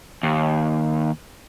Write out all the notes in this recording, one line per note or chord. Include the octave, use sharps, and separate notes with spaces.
D#2